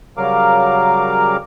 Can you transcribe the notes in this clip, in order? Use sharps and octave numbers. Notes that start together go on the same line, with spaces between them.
C#3 F#3 G3 A#4 F5 D6